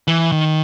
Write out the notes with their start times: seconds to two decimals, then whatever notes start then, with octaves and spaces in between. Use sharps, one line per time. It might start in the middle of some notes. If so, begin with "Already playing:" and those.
0.08 E3
0.32 D#3